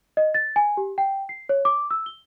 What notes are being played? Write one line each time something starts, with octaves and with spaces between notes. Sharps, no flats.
D#5
A6
G#5
G4
G5
C7
C#5
D6
E6
G7